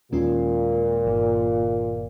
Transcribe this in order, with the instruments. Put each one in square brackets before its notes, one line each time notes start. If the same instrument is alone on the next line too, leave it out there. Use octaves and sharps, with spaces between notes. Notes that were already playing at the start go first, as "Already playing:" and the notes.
[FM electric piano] D#2 D#3 G#3 C#4 F4 [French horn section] A#2
[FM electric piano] G1 G2 D#3